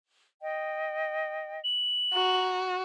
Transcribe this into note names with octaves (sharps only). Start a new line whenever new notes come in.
D#5 G5
F#7
F#4 A#5